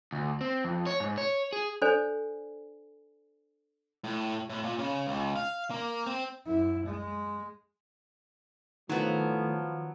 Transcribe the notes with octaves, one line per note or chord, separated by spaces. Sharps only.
D2
C4
F2
C#5
G#2
C#5
G#4
D4 A4 C5 D5 G#5
A2
A2
A#2
C#3
C#2
F5
A#3
C4
F#2 E4
G#3
A2 D#3 F3 F#3 B3